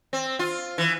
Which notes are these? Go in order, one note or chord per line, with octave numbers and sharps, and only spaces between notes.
C4
F4
E3